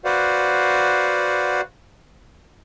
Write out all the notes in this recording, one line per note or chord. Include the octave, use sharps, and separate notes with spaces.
F#4 B4 C5 D5 F5 F#5